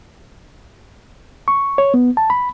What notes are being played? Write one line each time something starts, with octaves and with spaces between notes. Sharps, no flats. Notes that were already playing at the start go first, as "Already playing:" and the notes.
C#6
C#5
B3
A5
B5